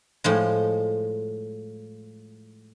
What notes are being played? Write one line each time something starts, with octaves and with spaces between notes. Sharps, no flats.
A2 F3 G#3